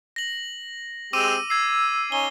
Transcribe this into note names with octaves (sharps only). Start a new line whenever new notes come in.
A#6 F#7
G#3 C4 G4 D6 E6 D#7
E6 G#6 C7
C#4 D#4 G#5 G7